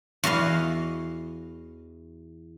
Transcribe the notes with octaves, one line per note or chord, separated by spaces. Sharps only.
E2 F#4 D#5 F5